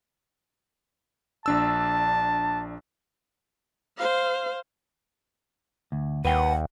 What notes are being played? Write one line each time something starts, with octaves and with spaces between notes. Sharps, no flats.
A#1 D4 A5 E6
C5 F5
D2
D#2 B4 F#5 G5